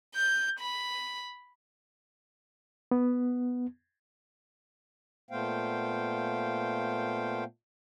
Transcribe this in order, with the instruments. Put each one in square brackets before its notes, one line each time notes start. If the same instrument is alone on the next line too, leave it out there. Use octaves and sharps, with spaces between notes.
[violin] G6
B5
[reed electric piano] B3
[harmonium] A#2 A3 B3 C5 F5 G5